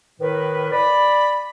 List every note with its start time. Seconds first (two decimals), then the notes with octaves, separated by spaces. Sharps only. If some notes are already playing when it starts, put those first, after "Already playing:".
0.20 A2 D#3 A#4 B4
0.71 D5 B5